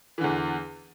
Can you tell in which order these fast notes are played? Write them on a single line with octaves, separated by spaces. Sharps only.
E3 D3 E2